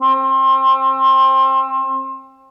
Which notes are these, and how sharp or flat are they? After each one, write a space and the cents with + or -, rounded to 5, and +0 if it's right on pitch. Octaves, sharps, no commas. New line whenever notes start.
C4 +25